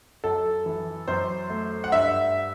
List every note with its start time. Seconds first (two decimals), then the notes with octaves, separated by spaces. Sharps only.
0.24 F#2 A4
0.66 E3
1.08 F#2 C5
1.50 A3
1.84 F#5
1.92 G2 E5